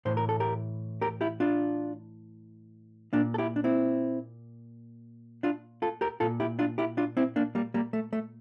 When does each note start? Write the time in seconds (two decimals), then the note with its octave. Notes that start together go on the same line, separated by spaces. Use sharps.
0.05 A2 E3 C5
0.17 A#4
0.29 A4
0.40 G4 A#4
1.01 G4 A#4
1.21 E4 G4
1.40 D4 F4
3.13 A#2 A#3 D4
3.34 A4
3.38 E4 G4
3.56 D4
3.64 C4 E4
5.43 D4 F4
5.82 F4 A4
6.01 G4 A#4
6.20 A#2 F4 A4
6.40 E4 G4
6.59 D4 F4
6.78 E4 G4
6.97 D4 F4
7.17 C4 E4
7.36 A#3 D4
7.55 G3 A#3
7.74 G3 A#3
7.93 A3
8.13 A3